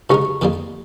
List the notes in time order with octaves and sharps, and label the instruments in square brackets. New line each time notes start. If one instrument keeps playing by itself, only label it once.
[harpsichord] C#3 G#3 D#4 A#4 [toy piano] G4
[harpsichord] F2 D#3 G3 A#3